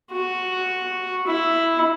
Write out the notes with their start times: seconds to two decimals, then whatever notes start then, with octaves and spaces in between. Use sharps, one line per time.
0.12 F#4
1.27 E4